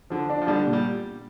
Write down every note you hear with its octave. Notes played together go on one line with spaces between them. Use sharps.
D3 F3
D4
F3
D3 G3 D4
A#2
G3